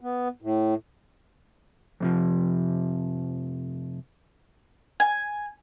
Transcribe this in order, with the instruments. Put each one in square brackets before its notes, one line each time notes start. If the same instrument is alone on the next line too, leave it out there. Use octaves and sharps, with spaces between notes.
[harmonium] B3
A2
[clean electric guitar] F2 C3 F3
[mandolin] G#5